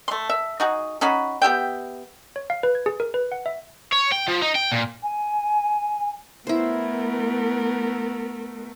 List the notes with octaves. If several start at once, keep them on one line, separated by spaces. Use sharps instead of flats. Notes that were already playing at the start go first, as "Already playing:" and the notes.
A3 C6
E5
D#4 F#4 G#4
C#4 D#4 F#4 B5
B3 G4 E5 G5
C#5
F5
B4
G#6
G#4
A#4
B4
F#5
E5
C#5
G5
F3
D#4
G5
A#2
G#5
A3 B3 E4 A#4 C5